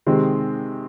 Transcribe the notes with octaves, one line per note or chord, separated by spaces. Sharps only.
C3 D#3 G#3 C4